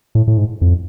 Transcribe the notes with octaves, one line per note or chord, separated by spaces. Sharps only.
A2
A2
G#2
F2